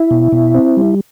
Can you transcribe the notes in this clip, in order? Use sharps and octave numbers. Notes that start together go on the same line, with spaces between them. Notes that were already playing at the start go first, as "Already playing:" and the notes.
Already playing: E4
B2
B2
C4
G3